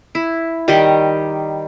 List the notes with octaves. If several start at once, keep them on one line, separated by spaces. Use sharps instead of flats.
E4
D#3 G3 G4 D#5